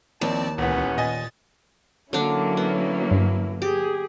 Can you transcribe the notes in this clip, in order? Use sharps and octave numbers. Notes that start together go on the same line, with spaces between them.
D#2 F3 C4 D5 A5
D#1 C#2 E3 B3 C#4
A#2 D#5 G#5 A6
D3 F#3 A#3 C#4 D4 E4
B3
G2
G4 G#4